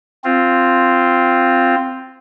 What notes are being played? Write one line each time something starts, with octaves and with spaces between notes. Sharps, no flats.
C4 F4